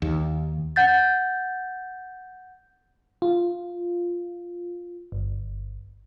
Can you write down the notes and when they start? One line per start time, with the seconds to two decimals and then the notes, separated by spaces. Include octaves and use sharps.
0.02 D#2
0.76 F#5 G6 A6
3.22 F4
5.12 G1